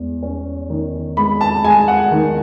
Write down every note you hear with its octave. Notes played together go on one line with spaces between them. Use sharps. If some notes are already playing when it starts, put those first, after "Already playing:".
Already playing: E2 G#3
C#4
D#3
G#3 B5
A5
G#3 G#5
F#5
D#3